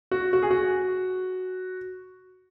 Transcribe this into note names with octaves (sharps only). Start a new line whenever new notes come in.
F#4
F#4
G#4
F#4